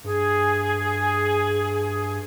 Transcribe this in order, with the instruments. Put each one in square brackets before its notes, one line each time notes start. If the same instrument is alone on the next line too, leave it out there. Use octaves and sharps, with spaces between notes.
[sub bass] G2 [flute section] G#4